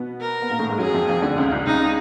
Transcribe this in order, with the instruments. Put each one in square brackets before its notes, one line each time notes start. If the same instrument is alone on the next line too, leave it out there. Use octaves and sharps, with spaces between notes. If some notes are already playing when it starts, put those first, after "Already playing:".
Already playing: [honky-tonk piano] B2 B3
[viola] A#4
[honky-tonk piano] B3
A#2 A#3
A2 A3
G#2 G#3
[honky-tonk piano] F#2 F#3 [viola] G#4
[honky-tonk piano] F2 F3
F2 F3
D2 D3
C#2 C#3
C2 C3
[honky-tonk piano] C#2 C#3 [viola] D#4